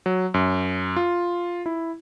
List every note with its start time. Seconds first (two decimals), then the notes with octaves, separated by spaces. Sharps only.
0.06 F#3
0.34 F#2
0.96 F4
1.66 E4